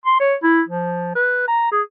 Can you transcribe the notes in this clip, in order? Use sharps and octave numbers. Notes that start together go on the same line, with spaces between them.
C6
C#5
E4
F3
B4
A#5
G#4